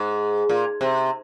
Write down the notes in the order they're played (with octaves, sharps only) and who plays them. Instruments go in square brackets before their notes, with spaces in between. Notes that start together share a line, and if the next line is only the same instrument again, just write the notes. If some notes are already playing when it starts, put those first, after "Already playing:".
Already playing: [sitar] G#2
A#2
C3